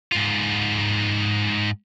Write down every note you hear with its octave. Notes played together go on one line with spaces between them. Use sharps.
G#2 F4